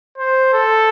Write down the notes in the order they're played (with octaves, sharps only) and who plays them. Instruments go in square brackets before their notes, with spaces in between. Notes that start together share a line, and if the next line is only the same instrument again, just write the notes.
[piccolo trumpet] C5
A4